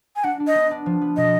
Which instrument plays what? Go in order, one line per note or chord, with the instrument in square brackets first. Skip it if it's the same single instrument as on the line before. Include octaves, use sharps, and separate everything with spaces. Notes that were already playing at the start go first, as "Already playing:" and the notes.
[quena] G#5
[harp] D4 [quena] F#5
[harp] D4
[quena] D#5
[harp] B3
D4
F3
B3
[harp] B2 [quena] D#5